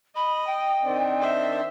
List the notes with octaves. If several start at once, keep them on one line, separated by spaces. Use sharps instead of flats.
D#5 B5
G5
D#3 C4 D4
C5 E5